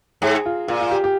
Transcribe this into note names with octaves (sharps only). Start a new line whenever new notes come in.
G#2 G#4
F4
A#2 F4
F4
G4
G4